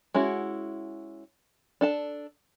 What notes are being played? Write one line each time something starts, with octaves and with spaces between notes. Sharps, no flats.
G#3 C#4 E4 F#4
D4 A4 A5